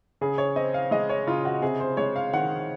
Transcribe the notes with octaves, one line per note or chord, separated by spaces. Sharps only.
C#3 G#4
C#5
C4 D#5
F5
G#3 D#5
C#5
C#3 F4
F#4
C3 G#4
C5
G#3 C#5
F5
D#3 F#5